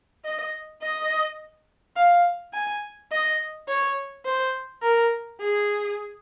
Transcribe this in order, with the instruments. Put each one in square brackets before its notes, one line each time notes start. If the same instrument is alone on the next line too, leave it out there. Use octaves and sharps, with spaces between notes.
[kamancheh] D#5
D#5
F5
G#5
D#5
C#5
C5
A#4
G#4